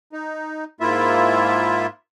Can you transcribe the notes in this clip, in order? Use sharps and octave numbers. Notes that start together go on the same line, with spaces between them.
D#4
G#2 A#3 E4 F4 E5